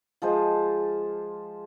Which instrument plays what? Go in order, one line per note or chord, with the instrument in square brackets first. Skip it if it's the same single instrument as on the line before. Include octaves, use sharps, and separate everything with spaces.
[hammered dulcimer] F3 G#3 C5